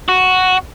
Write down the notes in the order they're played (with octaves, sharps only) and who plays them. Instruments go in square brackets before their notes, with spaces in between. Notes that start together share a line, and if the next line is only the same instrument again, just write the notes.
[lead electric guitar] F#4